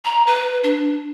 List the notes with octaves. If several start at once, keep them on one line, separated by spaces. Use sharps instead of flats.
A#5
B4
D4